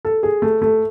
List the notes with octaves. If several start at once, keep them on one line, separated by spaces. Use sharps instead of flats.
A4
G#4
A3
A3